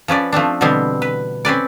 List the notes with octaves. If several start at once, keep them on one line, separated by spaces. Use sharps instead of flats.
F3 C#4 B4 D5
F3 A3 C4 D4
B2 D3 E3 G3 B3 C4
B4
C4 C#4 B4 D5